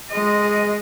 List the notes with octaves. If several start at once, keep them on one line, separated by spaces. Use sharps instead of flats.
G#3 D#5